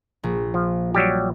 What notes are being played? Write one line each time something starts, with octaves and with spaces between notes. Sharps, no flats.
A#1
F3
F#3 G3 G4